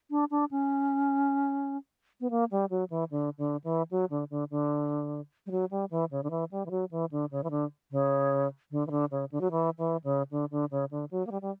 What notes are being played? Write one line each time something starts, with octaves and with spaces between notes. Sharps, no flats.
D4
D4
C#4
B3
A#3
G3
F#3
E3
D3
D3
E3
F#3
D3
D3
D3
G3
F#3
G3
E3
C#3
D3
E3
G3
E3
F#3
E3
D3
C#3
E3
D3
C#3
D3
E3
D3
C#3
D3
F#3
E3
E3
C#3
D3
D3
C#3
D3
F#3
A#3
G3
G3